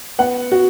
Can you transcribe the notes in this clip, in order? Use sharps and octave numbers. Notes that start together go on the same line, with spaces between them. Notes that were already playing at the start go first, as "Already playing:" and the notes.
B3 F#5
F#4